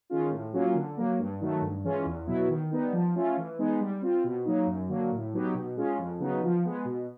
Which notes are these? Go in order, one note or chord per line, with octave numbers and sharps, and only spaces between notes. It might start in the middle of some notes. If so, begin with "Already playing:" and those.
D#3 G#3 C#4 F4
A2
F#3 A#3 C#4 F4
D3
F#3 A#3
G2
D#3 F#3 A3
G2
E3 G#3 C#4 F4
E2
B2 F#3 B3 E4
D#3
G3 B3 D#4
F3
A3 C#4 F4
E3
G#3 B3 D#4
G3
C4 F4
B2
F#3 A#3 D#4
F#2
D3 F#3 A#3
A2
F#3 B3 D#4 G4
B2
G#3 C#4 F4
F2
C#3 F#3 B3 D#4
F3
G#3 B3
B2